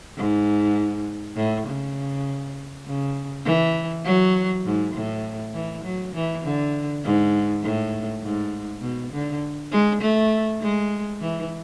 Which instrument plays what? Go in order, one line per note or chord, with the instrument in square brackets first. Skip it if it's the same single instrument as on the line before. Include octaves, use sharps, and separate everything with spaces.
[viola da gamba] G#2
A2
C#3
C#3
E3
F#3
G#2
A2
E3
F#3
E3
D3
G#2
A2
G#2
B2
D3
G#3
A3
G#3
E3